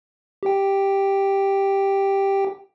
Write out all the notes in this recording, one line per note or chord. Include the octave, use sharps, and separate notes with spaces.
G4 G5